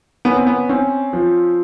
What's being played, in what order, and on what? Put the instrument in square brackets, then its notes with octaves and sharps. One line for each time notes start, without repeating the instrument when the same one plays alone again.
[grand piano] B3 [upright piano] C#4
[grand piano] C4
B3
[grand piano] C4 [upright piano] C#4
[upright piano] F3